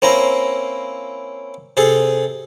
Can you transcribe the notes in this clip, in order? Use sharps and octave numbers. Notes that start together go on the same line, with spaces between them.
A#3 C4 C#4 E4 A#5
C3 G#4 A4